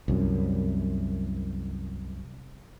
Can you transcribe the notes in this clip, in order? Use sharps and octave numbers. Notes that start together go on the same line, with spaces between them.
C2 F#2